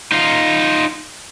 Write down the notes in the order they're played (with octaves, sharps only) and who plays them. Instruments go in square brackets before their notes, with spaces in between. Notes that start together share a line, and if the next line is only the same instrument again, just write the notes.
[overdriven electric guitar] D#4 F4